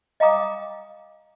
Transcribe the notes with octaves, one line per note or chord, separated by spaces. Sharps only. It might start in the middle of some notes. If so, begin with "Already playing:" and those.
D#5 F5 G5 A#5 D6 D#6